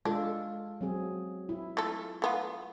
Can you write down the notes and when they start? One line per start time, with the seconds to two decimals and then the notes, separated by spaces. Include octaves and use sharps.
0.05 G#3 D4 F4 A4
0.81 F#3 C4 G#4
1.49 E4
1.77 A3 F4 A4
2.22 A3 B3 F4